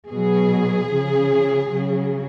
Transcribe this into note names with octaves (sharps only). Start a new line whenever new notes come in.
B2 F#3 G#4
C#3 F3
C#3 F#3